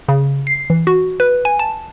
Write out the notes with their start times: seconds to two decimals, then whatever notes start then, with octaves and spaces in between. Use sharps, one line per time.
0.08 C#3
0.47 C7
0.70 E3
0.87 F#4
1.20 B4
1.45 G#5
1.59 A5